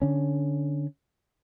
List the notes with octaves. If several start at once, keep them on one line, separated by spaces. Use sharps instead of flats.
D3 C#4